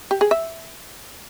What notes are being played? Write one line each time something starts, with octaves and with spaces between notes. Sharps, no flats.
G4
G#4
E5